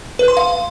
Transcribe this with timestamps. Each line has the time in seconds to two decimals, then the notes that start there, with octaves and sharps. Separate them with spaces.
0.19 B4
0.28 C6
0.37 F5